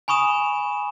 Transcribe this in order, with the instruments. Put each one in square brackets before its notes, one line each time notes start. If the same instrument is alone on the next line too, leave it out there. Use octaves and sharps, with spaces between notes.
[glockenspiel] G#5 B5 C#6 D#6 E7